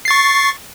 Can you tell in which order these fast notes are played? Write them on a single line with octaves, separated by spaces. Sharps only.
C7 A6 C#6